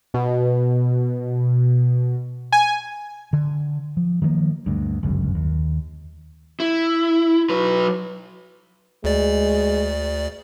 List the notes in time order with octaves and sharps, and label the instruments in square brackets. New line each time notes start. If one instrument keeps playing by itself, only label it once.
[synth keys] B2
G#5
[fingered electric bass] D3
F3
D#3 F3 G3 A#3
D2 G2
G1 C#2 F#2
D#2
[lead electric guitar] E4
F#3 B4
[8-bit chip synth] D2 D5 [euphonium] G#3